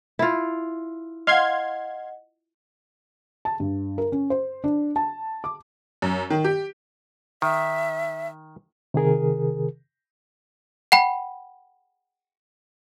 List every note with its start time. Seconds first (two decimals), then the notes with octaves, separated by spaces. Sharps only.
0.19 E4 F4
1.27 D#5 F5 F#5 C6 G#6
3.45 A5
3.60 G2
3.98 A#4
4.12 C#4
4.30 C5
4.64 D4
4.96 A5
5.44 D6
6.02 F#2
6.30 D#3
6.44 G4
7.42 D#3 E5
8.94 C3 D#3 G#4 A#4
10.92 F#5 G5 B5